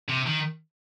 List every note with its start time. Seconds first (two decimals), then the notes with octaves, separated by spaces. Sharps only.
0.09 C3
0.27 D#3